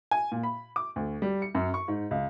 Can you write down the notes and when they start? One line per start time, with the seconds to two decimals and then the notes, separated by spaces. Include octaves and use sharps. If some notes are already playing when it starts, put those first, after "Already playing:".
0.11 G#5
0.32 A#2
0.43 B5
0.76 D6
0.96 D2
1.22 G3
1.42 C#7
1.55 F#2
1.74 C#6
1.88 G#2
2.11 C#2